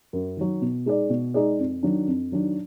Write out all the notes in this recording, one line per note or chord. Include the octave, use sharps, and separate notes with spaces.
F#2
D#3 F#3
B2
G#3 D#4 G#4 D5
B2
G#3 D#4 G#4 D5
F2
D#3 F#3 D4
F2
D#3 F#3 D4